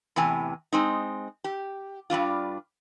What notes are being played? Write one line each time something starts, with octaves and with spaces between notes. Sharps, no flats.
E2 A2 C3 G#5
G#3 C4 D#4
G4
G2 G3 D4 F4